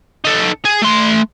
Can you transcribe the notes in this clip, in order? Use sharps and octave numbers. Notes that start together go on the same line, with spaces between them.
D#4 A4
G#4
A3 C6